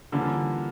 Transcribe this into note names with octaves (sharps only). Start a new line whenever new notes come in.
D3 E3 G3 A#3 C#4 F4